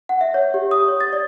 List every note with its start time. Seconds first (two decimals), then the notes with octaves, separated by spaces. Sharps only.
0.09 F#5
0.21 E5
0.34 C#5
0.54 G4
0.71 D#6
0.88 C#5
1.00 A6
1.13 D5